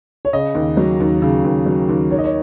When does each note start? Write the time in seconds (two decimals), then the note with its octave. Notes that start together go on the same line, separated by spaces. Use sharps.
0.25 C#5
0.33 C#3 D#5
0.55 D#2
0.77 F#3
1.00 D#2
1.22 C#3
1.45 D#2
1.66 F#3
1.89 D#2
2.11 D#3 C#5
2.18 D#5
2.25 C#5